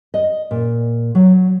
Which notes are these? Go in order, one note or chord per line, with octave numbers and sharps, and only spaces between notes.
D#5
A#2
F#3